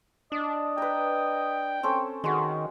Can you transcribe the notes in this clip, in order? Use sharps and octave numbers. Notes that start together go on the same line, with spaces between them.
D4 D#5
B4 G5 A#5
C4 C#4 A4
D#3 G#3 F#4